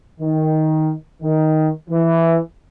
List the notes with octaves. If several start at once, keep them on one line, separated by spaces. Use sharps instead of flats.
D#3
D#3
E3